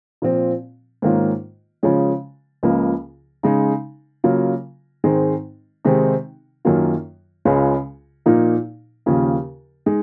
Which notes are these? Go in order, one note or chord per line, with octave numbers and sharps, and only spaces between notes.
A#2 F3 C4
G#2 D#3 A#3 C#4 F4
C#3 F3 G#3 C#4
C#2 C#3 F3 A#3
C#3 G#3 D#4
C#3 F#3 A#3 F4
G#2 D#3 G#3 C4 D#4
C3 D#3 G#3 C4 D#4
F#2 D#3 F#3 A#3 F4
C#2 C#3 G#3 C#4 F4
A#2 F3 A#3 D#4
D#2 C#3 F3 A#3
G#3 D#4